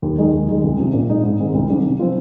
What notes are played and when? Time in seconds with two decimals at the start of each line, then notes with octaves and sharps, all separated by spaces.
0.02 D#2
0.18 D#3 G#3 D#4
0.33 D#2
0.48 D#3 G#3
0.63 C2
0.78 C3 F3
0.93 A#2
1.09 G#3 D#4
1.24 G#2
1.40 D#3 G#3 C4
1.54 C2
1.70 C3 D#3 G3
1.84 C3
1.99 F3 C4 F4